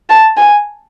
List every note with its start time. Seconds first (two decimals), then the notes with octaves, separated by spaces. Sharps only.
0.09 A5
0.37 G#5